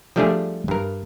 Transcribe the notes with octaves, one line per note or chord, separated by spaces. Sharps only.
F3 G3 A3 D4 G4 G#4
G2 A#4